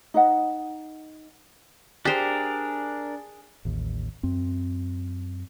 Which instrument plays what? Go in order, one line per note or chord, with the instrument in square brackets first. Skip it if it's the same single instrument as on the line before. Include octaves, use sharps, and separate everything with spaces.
[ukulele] D#4 B4 D#5 F#5
[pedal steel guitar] D4 A#4 [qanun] G4 C5 [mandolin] G#4
[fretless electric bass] A1 D#2
F#2 C4